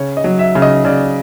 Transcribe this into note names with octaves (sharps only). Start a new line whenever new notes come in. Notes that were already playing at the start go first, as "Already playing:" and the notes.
Already playing: C#3 C#5
D#5
F#3
E5
C#3
D#5
C#3 D5